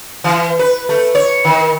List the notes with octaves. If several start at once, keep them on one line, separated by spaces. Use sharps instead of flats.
E3
B4
A3
C#5
D#3